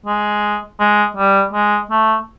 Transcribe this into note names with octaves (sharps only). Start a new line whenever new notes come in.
G#3
G#3
G3
G#3
A3